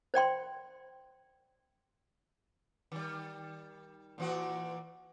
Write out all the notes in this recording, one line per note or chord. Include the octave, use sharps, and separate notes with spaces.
C5 D5 G5 C6
D#3 G3
A#2 E3 F#4